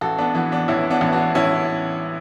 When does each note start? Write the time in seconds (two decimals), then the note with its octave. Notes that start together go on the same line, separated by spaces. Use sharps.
0.01 A1 F#4 A4
0.18 B3 D4
0.34 E3 B3
0.52 B3 D4
0.68 A1 C#4 E4
0.90 B3 D4
1.01 A1
1.13 D4 F#4
1.35 A1 C#4 E4